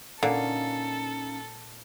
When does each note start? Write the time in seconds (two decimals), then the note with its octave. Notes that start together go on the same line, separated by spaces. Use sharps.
0.23 A#2 D3 C#4 D#4 A4 F5